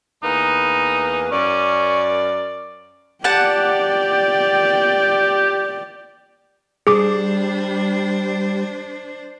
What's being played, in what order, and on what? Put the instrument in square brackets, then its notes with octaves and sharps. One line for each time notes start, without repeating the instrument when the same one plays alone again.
[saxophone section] E2 A#3 B4 [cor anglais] D#4
[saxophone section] F#2 A#4 D5 [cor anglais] C#4
[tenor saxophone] G4 [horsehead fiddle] D5 G5 [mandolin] F#5 A5
[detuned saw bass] G3 [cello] D4 C5 [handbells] G#4 D6